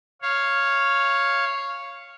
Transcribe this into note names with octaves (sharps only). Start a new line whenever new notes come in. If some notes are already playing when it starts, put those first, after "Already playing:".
C#5 F5